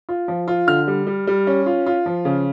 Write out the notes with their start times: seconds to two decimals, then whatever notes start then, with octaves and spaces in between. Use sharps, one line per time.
0.09 F4
0.28 F3
0.48 F4
0.67 D3 F6
0.88 G3
1.07 G3
1.27 G3
1.47 C#4
1.66 F4
1.86 F4
2.06 F3
2.25 C#3